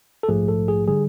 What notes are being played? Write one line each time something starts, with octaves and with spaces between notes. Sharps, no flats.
A4
A#1 G#2 F3 A3 G#4
A4
G#4
D3 G3 G#4